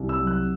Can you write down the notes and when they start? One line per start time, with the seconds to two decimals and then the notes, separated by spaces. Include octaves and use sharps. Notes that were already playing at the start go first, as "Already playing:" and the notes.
Already playing: C2
0.09 E6
0.19 F#3
0.27 F#6